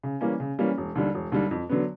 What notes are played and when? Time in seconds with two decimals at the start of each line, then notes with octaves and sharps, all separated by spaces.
0.04 C#3
0.21 E3 G3 A#3 C#4
0.40 C#3
0.59 E3 G3 A#3 C#4
0.77 E1
0.95 D#2 D3 G3
1.14 E1
1.32 D#2 D3 G3
1.51 F2
1.70 D3 F#3 B3